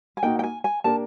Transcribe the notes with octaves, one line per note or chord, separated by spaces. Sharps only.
G#5
A#3 D#4 F#4 G5
G5
G#5
G#5
A#3 D4 G4 A#4 A5